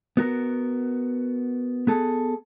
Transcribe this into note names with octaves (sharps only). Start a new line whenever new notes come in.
B3 F#4 A#4
B3 G#4 A4